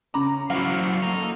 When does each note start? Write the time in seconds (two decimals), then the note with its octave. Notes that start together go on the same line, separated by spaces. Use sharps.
0.14 C#3 C#4 A#5 B5 D6
0.50 F#3 E4 F#4 C5 D5 F5
1.03 A#3 A4 D#5 A#5